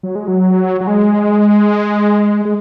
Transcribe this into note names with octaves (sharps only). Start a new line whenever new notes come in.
F#3
G#3
F#3
F#3
G#3
G#3